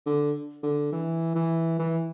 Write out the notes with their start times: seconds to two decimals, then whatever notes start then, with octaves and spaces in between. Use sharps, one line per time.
0.06 D3
0.63 D3
0.92 E3
1.35 E3
1.79 E3